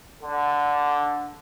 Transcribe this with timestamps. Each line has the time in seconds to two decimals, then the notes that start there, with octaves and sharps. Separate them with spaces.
0.22 D3